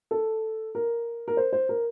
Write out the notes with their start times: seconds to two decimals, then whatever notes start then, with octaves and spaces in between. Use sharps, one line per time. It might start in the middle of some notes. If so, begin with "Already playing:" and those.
0.11 A4
0.75 A#4
1.28 A#4
1.37 C5
1.53 C5
1.69 A#4